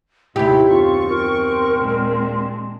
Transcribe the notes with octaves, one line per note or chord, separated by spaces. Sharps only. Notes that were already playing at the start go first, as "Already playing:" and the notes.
D#2 A2 C3 E4 G4 B5
F#2 B2 C4 F4 C#6
A#4
A#2 G#3 D4